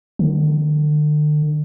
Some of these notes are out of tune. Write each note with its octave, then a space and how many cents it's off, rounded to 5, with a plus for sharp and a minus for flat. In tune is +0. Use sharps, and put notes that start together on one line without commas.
D3 +40